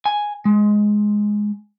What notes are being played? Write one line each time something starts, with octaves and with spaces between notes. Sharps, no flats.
G#5
G#3